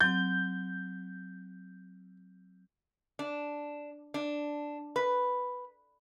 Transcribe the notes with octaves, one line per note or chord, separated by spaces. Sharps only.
F#3 C4 G6
D4
D4
B4